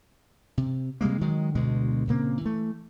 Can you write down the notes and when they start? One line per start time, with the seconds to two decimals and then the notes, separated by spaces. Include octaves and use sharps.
0.57 C3
1.01 C3 G3 G#3 A#3
1.21 D#3 F#3 G#3
1.55 D2 B2 D3 G#3
2.07 A#2 C#3 A#3 C4
2.41 E3 A3